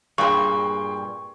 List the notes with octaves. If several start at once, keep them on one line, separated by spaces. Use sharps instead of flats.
G2 A#2 G#4 G5 C6 C#6